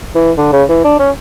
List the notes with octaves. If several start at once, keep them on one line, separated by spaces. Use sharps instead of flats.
E3
D3
C#3
E3
D4
C#4